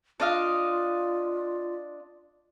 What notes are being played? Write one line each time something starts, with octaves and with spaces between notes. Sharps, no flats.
D4 F4 D#5 F5